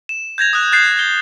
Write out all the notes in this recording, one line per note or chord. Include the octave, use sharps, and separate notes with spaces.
E7
G6 G#6 A#6 F7
D#6 F#6
F#6 G6 A6 C7 E7
C7 G7